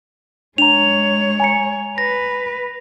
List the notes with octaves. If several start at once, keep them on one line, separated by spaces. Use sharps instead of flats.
G#3 D4 C#5 A#5 F7
G#5 A#5 C#7
B4 A#6